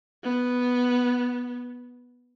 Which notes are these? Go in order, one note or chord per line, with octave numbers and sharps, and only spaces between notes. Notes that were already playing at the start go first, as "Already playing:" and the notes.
B3